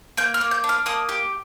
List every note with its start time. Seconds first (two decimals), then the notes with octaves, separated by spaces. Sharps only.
0.17 A#3 G6
0.34 F6
0.41 A#3
0.51 G6
0.64 D4
0.69 F6
0.86 A#3 D#6
1.09 G4